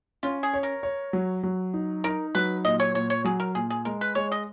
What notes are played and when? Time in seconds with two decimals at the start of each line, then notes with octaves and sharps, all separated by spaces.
0.23 C#4 F4
0.43 G#4
0.54 C#5
0.63 A#4
0.83 C#5
1.13 F#3
1.43 F#3
1.74 D#4
2.04 D#4 A#4
2.35 F#3 B4
2.65 A#2 D#5
2.80 C#5
2.94 A#2 C#5
3.10 C#5
3.25 F#3 G#4
3.40 A#4
3.55 A#2 G#4
3.70 G#4
3.85 G#3 A#4
4.01 B4
4.15 G#3 C#5
4.32 D#5